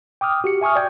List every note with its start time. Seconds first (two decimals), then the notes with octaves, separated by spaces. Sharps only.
0.21 G5 D6 D#6 F6
0.44 F#4 G4 C#7
0.61 E5 G#5 C#6 D#6 F6
0.76 D5 G5 G6 G#6